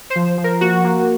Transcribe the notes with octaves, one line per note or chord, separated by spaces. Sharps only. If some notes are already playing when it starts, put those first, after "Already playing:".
C5
F3
F3
A#4
A#3 F#4
A#3